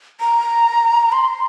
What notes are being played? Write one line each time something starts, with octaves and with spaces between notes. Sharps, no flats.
A#5
C6